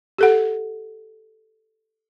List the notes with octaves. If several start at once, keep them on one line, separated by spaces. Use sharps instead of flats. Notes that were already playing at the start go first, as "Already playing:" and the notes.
G4 A4 F#5